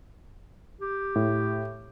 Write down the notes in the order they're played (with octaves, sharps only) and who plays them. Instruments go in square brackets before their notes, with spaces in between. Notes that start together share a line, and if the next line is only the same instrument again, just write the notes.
[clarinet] G4
[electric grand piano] A2